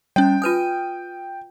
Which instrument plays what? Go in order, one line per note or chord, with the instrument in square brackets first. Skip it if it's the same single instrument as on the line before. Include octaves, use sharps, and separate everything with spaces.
[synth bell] G3 C#4 [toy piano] C#5 [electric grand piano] G5
[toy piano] F4 B4 G#5 [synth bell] D#6 F6 D#7